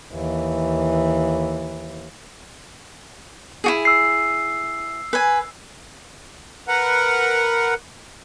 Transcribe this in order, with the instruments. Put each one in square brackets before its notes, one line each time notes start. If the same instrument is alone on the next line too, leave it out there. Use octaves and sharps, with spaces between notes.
[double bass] D#2 E3
[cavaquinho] E4 F#4 G#4
[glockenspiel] E6 C7
[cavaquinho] B4 G#5
[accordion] A#4 B4 F#5